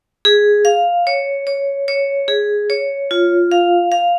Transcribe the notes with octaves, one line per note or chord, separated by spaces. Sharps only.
G#4
F5
C#5
C#5
C#5
G#4
C#5
F4
F5
F5